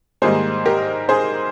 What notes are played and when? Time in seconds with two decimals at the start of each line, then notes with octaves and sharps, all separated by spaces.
0.22 G#2 D#3 G3 A#3 G#4 C5
0.66 G4 A#4
1.09 G#4 C5